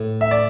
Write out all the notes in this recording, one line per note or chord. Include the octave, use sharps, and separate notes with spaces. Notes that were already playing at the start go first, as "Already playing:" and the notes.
Already playing: A2
E5
D5